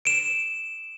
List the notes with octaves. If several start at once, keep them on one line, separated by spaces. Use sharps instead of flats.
D7 E7